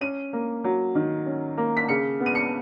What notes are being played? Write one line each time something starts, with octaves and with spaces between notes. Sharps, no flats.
C#4 D#7
A#3
F#3
D#3
C#4
A#3
B6
C#3 C#7
B3
D#7
C#7